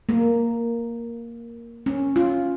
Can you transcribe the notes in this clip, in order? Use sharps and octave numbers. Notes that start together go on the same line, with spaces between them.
A#3
C#4
F4